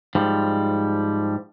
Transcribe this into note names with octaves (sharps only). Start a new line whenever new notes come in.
G#2 F3 G3